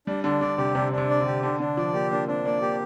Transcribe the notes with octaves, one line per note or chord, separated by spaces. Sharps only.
G3 D4
D3 D4
D3 D5
C3 G4
C3 D4
D4
C3
D5
D3
G4
D3 D4
D3 D4
F3 D5
A#3 G4
A#3 D4
C4 D4
A#3 D5
A#3 G4